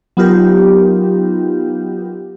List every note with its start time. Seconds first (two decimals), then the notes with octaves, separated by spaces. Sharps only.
0.17 F#3 B3 D#4 F4 G4 A#4